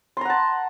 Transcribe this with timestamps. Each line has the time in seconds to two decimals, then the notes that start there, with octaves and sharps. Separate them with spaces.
0.17 C6
0.21 A#5
0.25 F#5
0.30 A5